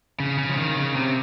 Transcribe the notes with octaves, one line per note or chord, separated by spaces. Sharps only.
C#3
C#3
F3
D#3
C#3
C3